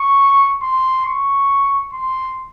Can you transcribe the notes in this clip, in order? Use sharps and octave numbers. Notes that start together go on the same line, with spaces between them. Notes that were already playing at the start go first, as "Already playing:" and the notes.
Already playing: C#6
C6
C#6
C6